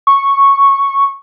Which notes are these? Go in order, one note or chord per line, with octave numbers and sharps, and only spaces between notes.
C#6